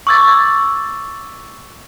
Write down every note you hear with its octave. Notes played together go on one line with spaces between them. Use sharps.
C#6 D6 E6 G#6 A6